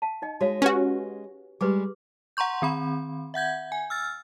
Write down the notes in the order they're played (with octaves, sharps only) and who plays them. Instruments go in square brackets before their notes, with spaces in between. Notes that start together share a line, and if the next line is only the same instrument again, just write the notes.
[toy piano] F5 A5
D#4 D#5 G5
[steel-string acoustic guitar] G#3 [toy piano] F#4 C#5 F5
[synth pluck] C#4 F#4 [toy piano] G4 B4 G#5
[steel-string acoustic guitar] G3 G#3 [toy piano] G4 B4 D6
[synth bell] F#5 A#5 C6 C#6 G6
D#3 C4 B5
E5 F#5 G6 G#6
G#5
E6 F6 A6